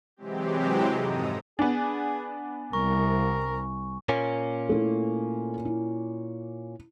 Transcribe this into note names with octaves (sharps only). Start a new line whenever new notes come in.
C3 E3 F#3 G#3 C4 G4
F2 G#2 D#4 A4 A#5 D#6
B3 D4 G#4 G#5
C2 A#4 C#6
A#2 A#3 C#4
A3 E4
E4